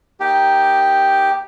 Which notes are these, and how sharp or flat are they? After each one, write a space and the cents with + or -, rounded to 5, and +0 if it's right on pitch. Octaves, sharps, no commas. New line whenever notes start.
A#3 +0 D#4 +0 G4 +0